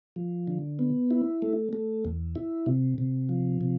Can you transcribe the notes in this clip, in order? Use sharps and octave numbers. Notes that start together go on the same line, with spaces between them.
F3
D3
B3
E4
A3
A3
E2
E4
C3
C3
F3
C3